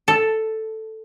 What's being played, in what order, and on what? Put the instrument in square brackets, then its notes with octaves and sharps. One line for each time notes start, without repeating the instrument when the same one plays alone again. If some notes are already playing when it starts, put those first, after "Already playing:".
[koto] A4